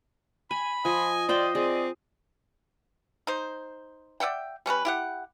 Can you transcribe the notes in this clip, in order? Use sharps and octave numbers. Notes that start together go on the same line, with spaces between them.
G#5 B5
F3 D#5 G#5
F4 C5 D5 G5
C4 G#4 D5
D#4 C5
D5 E5 F#5 G5
G3 C#4 A#4 B4
E4 G4 F#5